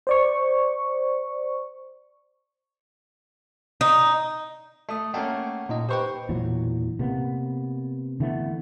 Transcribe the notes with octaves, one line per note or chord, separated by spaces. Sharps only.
C5 D5 C#6
D#4
A3 A5 D#6
A3 A#3 C#4 F#5 G5 A5
A#2 D#4 D#5
G4 B4 C5 G5 C#6
E1 A#2 E3 F#3
C3 A#3 B3
D3 E3 A3 B3